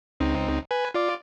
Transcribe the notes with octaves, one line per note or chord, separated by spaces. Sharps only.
C#2 C4 D#4
B4 G#5
F4 D5 D6